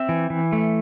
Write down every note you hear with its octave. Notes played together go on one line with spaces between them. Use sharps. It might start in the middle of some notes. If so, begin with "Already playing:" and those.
Already playing: C4 E5
E3
E3
A3